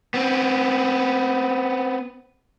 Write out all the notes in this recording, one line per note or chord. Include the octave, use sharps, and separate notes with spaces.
B3 C4